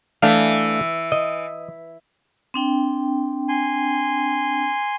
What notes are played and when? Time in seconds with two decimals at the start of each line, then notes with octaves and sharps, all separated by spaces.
0.22 E3 A3 D4 F5
1.12 D#5
2.54 C4 D4 G5
3.49 G#5 C6